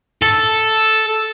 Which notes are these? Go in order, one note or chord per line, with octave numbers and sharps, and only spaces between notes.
A4